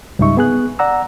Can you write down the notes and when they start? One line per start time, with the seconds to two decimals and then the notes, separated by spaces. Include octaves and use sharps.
0.19 C#2 G#2 G3 D#4 E5 C#6
0.37 B3 G#4 F#6
0.79 D5 F#5 A#5 E6